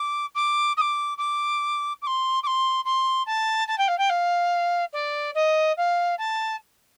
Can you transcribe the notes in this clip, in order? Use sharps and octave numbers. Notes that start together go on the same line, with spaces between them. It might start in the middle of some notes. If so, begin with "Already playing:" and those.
Already playing: D6
D6
D#6
D6
D6
D6
C6
D6
C6
C6
A5
A5
G5
F5
G5
F5
D5
D#5
F5
A5